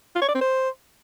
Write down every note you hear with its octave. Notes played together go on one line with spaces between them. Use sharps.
F4
C#5
D5
C4
C5